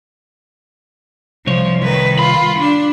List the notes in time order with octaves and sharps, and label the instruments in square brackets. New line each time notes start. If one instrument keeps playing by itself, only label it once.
[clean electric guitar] C2 C#5 [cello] F3
[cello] D#3 B4
[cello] F4 [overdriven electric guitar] B5
[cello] D4